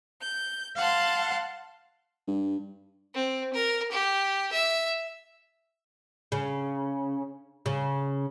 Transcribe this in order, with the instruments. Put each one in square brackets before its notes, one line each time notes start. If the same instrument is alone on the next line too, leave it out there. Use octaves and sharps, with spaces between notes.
[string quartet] G6
F5 F#5 A5 C6
[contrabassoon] G2
[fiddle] C4
A#4
G4
E5
[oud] C#3
C#3